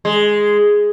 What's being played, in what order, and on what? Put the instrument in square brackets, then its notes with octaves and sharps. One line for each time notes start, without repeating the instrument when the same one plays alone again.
[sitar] G#3